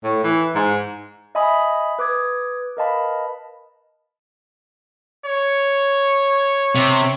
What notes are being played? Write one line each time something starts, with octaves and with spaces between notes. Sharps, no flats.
A2
E3
G#2
D#5 E5 G#5 B5 D#6
B4 D6 D#6 G#6
A#4 B4 D#5 F5 A5 B5
C#5
C3